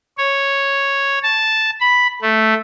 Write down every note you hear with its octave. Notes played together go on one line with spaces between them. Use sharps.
C#5
A5
B5
A3